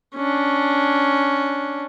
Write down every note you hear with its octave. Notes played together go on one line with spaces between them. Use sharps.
C#4 D4